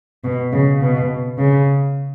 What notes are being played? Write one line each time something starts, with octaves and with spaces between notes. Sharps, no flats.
B2
C#3
B2
C#3